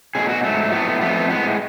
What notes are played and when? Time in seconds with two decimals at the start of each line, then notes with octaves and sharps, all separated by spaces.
0.15 B2 F#3 A3 G#4
0.29 F#4
0.43 G#2 F#3 A3
0.72 A2 F#3 A3 B3
1.01 F2 F3 A3 B3
1.29 A2 G#3 B3